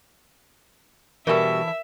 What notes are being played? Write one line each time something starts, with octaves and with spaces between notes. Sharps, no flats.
B2 E3 G3 E4 A4 A#4 E5